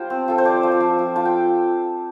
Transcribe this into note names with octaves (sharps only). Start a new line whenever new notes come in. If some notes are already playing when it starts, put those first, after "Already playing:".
Already playing: G3 F4 C5 G5 A5
C4
F3 A4
C5
F4 D5
F3
D5
F3
F3
F4 A5
G5